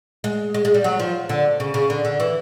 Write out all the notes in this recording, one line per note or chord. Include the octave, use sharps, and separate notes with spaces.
G#3
G#3
G#3
G3
F#3
F3
D3
C#3
C#3
D3
D3
E3